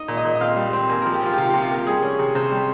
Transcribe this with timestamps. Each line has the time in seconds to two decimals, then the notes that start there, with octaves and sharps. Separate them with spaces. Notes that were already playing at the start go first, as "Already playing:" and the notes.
Already playing: D#4 D#5
0.08 A#2
0.17 D#5
0.25 A#2
0.35 D#5
0.41 C4 F5
0.57 G3
0.73 C4
0.89 A#3 G#5
1.02 A#4
1.06 F3
1.14 G4
1.22 F3 F4
1.33 G4
1.38 C3 F4
1.50 C3 G4
1.62 F4
1.71 A#3 G4
1.87 G3 G#4
2.03 C#4
2.19 C3
2.35 C3 C5
2.51 G3